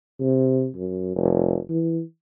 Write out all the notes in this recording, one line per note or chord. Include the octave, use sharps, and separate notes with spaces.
C3
F#2
F1
E3